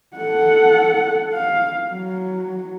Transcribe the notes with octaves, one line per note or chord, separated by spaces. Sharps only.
A4 F#5
F5
F#3